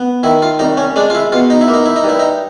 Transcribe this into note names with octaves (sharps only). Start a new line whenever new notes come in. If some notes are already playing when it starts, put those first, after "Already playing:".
Already playing: B3
D#3 E4
F4
C2 D#4
C#4
G#3 D4
F4
E4
B2 F4
D#4
E4
A#3
D#4
E4
D#4
G2 E4
D#4